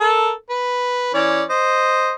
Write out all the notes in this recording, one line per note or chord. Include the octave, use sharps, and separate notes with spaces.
A4 A#4
B4
E3 C#4 D5
C5 D#5